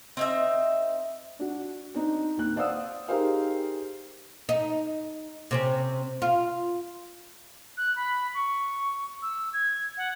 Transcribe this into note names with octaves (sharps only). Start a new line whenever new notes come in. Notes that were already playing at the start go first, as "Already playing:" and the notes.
C4 D#4 E5
D4 F#4
C4 D4 D#4
D#2 F#6
C5 D5 F5 F#5 D#6 E6
D#4 G4 G#4 A#4 C5 F5
D#4
C3 C4 C#4
F4
F#6
B5
C#6
E6
G#6
F#5